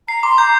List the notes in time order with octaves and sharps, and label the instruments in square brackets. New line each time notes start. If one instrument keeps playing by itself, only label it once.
[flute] A#5 [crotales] C7
[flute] C6 [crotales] D6
[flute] A#5 [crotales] G6